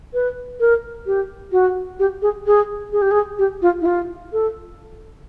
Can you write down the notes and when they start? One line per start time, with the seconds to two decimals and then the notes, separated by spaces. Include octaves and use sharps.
0.14 B4
0.60 A#4
1.06 G4
1.52 F#4
1.99 G4
2.22 G#4
2.47 G#4
2.92 G#4
3.02 G4
3.11 G#4
3.39 G4
3.62 F4
3.81 E4
3.86 F4
4.33 A4